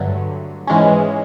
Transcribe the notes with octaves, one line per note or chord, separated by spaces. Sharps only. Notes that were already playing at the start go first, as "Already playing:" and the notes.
Already playing: G2 D3 F#3 A3
G#2 E3 G#3 C#4